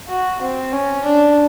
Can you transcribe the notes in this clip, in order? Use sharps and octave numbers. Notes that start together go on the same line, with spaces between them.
F#4
C4
C#4
D4